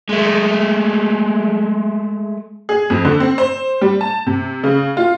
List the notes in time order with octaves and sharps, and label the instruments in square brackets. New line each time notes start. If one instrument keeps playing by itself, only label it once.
[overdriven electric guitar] G#3 A3
[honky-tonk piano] G#4
F2
D3
C4
C5
G3
A5
C3
C#3
F4